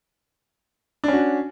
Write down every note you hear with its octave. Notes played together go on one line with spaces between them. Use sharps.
C#4 D4 F#4